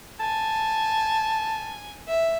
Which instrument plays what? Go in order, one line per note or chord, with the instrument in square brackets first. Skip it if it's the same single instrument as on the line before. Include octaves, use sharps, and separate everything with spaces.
[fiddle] G#5 [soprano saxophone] A5
[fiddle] E5